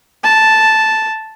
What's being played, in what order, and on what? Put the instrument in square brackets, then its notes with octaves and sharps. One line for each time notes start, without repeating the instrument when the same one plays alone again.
[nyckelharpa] A5